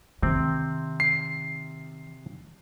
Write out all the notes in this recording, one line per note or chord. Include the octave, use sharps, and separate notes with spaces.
C3 D#3 C4
C7